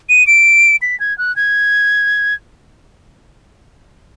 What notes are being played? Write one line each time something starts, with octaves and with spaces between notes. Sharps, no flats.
D#7
D7
B6
G#6
F#6
G#6